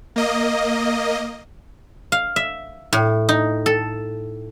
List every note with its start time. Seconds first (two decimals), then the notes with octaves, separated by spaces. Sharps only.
0.16 A#3 D#5
2.12 F5
2.36 E5
2.93 A2
3.29 D#4
3.66 A4